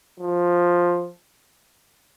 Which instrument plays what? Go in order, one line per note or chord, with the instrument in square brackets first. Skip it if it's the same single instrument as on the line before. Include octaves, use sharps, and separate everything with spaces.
[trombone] F3